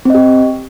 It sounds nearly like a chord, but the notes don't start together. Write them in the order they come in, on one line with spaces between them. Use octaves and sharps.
C4 D#5 G4